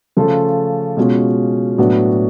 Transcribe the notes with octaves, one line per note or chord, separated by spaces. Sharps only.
C#3 F3 A3 F4 A4
B2 G#3 C#4 F4
A2 F#3 B3 D4 F#4